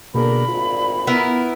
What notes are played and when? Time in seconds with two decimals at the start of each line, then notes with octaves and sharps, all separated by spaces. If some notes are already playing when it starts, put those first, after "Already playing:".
0.14 B2 D3 A#3 D4 G#4 A#4 B5
0.48 G#1 D2 A#2 F4
1.07 B3 E4 A#4